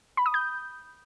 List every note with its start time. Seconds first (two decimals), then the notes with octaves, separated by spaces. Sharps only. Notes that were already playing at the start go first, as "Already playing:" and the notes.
0.17 B5
0.26 D#6
0.34 G6